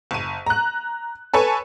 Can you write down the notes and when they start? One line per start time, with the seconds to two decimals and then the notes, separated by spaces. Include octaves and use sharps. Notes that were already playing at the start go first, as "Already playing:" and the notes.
0.11 F#1 D#7
0.46 A#5 F#6
1.34 A4 B4 C#5 G#5 A5